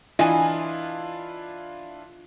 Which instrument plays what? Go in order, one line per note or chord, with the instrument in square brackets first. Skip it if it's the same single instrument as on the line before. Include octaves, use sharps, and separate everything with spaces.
[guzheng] E3 [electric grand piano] D4 E4 F4 [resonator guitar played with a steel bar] D#5 G#5